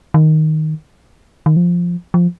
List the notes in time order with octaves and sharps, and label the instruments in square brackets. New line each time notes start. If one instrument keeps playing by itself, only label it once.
[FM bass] D#3
D#3
F3
F3